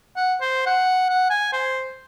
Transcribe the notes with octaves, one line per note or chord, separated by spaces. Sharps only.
F#5
C5
F#5
F#5
G#5
C5